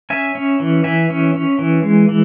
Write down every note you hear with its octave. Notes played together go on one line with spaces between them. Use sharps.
C#4 E5 G#5
C#4
E3
E3 E5 G#5
C#4
C#4
E3
G#3
E3